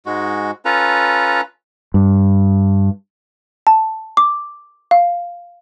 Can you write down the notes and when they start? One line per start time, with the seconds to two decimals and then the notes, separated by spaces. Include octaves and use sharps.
0.06 G#2 G#3 F#4
0.65 C#4 F4 A4 B4 A#5
1.94 G2
3.67 A5
4.17 D6
4.91 F5